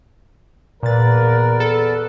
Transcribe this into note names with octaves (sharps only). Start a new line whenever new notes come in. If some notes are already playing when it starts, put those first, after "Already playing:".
E2 A#2 A#4 B4 D5 A6
A4